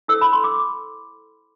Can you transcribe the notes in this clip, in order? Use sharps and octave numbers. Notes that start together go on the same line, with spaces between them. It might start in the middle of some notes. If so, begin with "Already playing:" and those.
E4 A4 C5 E6
B5
C6
D6